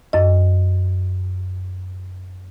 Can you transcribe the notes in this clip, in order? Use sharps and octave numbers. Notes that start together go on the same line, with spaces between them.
F#2 D#5